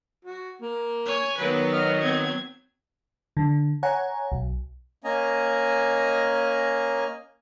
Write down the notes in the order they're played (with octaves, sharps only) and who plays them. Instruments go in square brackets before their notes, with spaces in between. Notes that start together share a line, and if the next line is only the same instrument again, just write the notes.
[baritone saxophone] F#4
A#3
[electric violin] C#5 G#5
[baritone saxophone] D#3 [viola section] F#3 B3 [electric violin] B4
[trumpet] D#5 [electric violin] F6
[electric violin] C4 G#6
[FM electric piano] D3
C#5 F#5 G#5 A#5
B1
[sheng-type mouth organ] A#3 C#4 D#5 G#5 A#5